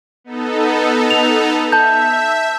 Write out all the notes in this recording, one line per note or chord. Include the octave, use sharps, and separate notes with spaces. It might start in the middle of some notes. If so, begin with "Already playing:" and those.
B3 D#4 A4
F7
E5 A5 G6